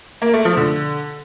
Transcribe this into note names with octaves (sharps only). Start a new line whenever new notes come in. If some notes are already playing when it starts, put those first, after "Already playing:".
A#3
A3
F3
D3